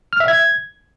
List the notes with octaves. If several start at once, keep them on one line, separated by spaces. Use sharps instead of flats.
F6
E5
G#6